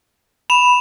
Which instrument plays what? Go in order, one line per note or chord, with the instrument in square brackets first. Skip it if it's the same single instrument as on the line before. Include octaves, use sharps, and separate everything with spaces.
[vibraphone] B5 [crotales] E7 F7